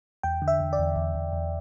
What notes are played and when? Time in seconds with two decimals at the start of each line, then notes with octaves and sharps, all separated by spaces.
0.23 E2 G5
0.42 D3
0.48 E5
0.60 E2
0.73 D5
0.79 E2
0.96 E2
1.15 E2
1.33 E2